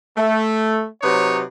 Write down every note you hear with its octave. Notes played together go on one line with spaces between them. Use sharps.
A3
C3 F#3 D#4 B4 C#5